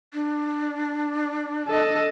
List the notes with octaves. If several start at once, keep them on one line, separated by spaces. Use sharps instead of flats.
D4
A4 D#5